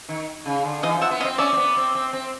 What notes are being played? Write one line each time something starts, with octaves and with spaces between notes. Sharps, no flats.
D#3
C#3
D3
E3 D#5 F5
F3
E5 F#5
B3
D#5 F5
C4
C#4 D5 E5
C4
B3
C4
C4
C4